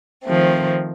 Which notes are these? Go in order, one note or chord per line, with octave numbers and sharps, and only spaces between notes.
D#3 F3 A3 C4